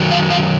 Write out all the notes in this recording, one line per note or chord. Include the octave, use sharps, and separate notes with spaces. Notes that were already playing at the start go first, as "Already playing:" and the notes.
Already playing: F#2 D#3 F#3
F5
F5